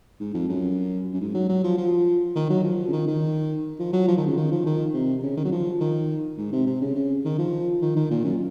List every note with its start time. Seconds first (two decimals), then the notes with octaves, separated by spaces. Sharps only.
0.20 G#2
0.34 F2
0.49 F#2
1.14 F#2
1.21 G#2
1.34 F#3
1.49 F#3
1.64 F3
1.78 F3
2.35 D#3
2.50 F#3
2.64 F3
2.88 C#3
2.93 D#3
3.07 D#3
3.79 F3
3.93 F#3
4.08 F3
4.17 D#3
4.27 C#3
4.37 D#3
4.51 F3
4.66 D#3
4.94 C3
5.23 C#3
5.37 D#3
5.45 F#3
5.52 F3
5.81 D#3
6.38 G#2
6.53 C3
6.67 C3
6.81 C#3
6.95 C#3
7.24 D#3
7.39 F3
7.82 D#3
7.96 D#3
8.10 A#2
8.24 F#2